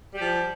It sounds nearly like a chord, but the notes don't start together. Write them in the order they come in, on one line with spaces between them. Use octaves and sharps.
G3 G4 F3